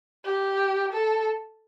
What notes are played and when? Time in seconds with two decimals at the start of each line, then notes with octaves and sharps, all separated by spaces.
0.25 G4
0.93 A4